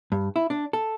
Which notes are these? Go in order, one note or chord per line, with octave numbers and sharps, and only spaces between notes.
G2
E4
D4
A4